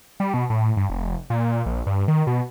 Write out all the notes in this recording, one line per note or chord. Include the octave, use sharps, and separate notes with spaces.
G3
B2
A2
G2
F1
A#2
A#1
G2
D#3
B2